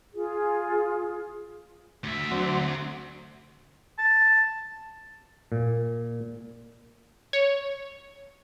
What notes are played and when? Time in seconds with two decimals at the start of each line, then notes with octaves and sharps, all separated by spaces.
0.12 F4 G#4
2.04 D2 E5
2.31 D3 F#3 C4
3.98 A5
5.52 A#2
7.33 C#5